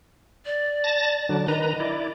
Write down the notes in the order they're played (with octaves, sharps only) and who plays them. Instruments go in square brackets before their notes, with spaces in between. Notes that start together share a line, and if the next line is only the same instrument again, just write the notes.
[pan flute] D5
[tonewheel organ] A5 A6 A#6
D3 F#3 D4
[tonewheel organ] D#3 B4 A#5 [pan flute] D#5
[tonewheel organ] E4 D5